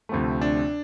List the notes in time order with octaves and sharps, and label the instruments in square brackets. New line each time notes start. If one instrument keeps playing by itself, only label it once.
[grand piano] D2 C3 F3 A3
D4